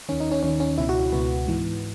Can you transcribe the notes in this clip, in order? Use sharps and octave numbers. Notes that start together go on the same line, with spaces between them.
D#2 D#3 C#4
D#4
C#4
D#2 D#3 C#4
C#4
C#2 B2 E4
F#4
C#2 B2 B3
G#2 E3